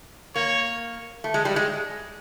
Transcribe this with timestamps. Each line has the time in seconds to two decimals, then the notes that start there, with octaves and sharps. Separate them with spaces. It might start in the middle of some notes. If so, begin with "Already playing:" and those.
0.35 A#3 C#5
1.24 A3
1.34 G#3
1.45 G3
1.56 G#3